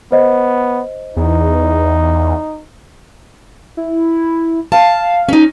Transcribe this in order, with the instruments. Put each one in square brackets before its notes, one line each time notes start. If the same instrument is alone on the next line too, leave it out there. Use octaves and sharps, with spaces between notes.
[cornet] B3 [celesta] C5 D#5
[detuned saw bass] E2 [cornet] D#4
[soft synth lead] E4
[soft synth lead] F5 [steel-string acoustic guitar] A5
[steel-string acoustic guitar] C#4 D#4